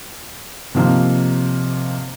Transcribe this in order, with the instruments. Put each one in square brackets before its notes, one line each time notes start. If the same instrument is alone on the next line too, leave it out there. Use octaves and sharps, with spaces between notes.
[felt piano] C3 D#3 F3 A#3